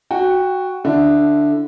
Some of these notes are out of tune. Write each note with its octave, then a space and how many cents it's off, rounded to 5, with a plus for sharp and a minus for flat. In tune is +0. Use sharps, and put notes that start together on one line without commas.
F#4 +0 G5 +20
D3 +0 E4 +0